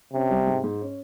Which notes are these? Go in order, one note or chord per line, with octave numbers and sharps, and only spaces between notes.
C3 C#4
G3
G#2
G#2
C#4